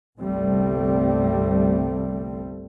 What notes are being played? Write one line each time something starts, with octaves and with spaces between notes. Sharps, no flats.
G1 C2 C3 G3 A3 C4